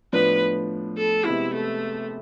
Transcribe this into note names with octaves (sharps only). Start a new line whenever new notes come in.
A2 F3 B3 D4 B4
A4
C3 G#3 B3 E4
A3